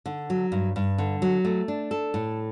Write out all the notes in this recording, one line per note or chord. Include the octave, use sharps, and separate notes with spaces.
D3
F#3
G2
G2
D3
F#3
A3
D4
A4
A2